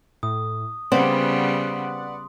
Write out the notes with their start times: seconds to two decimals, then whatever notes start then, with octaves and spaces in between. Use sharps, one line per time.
0.23 A2 D#6
0.92 C#3 G3 B3 C4 B4 D5 F#5 C6